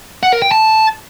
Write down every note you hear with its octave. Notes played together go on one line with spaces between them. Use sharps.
F#5
A#4
G5
A5